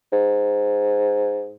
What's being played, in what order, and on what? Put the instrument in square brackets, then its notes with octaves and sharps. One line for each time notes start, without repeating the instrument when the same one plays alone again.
[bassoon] G#2